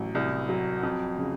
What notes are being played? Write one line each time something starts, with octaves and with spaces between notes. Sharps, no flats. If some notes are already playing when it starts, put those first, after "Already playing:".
Already playing: A1 F#3
C2
F#3
F2
C#3